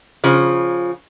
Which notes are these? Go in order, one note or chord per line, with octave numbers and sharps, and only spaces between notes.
C#3 F3